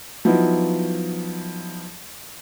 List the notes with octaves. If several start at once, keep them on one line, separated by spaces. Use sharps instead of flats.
F3 F#3 B3 D#4 E4